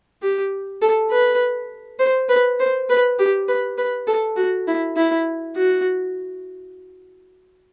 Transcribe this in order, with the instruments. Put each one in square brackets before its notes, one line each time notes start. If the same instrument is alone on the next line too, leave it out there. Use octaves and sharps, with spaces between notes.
[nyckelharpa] G4
A4
B4
C5
B4
C5
B4
G4
B4
B4
A4
F#4
E4
E4
F#4